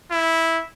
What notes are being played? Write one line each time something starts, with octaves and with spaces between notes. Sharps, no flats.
E4